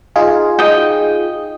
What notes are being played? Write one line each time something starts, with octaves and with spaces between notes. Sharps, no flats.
D#4 F4 G#4
D#5 G5